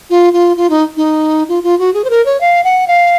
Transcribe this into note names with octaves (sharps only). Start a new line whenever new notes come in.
F4
F4
F4
D#4
D#4
F4
F4
F#4
G#4
C5
A#4
C#5
F5
F#5
F5